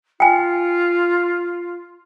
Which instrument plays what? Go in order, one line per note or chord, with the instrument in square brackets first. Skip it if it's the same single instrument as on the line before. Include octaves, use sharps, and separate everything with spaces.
[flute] F4 [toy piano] G5 G#5